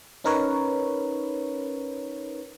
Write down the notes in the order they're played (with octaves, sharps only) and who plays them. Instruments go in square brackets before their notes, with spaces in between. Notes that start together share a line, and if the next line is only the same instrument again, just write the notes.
[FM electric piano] C#4 D#4 A#4 B4 C#5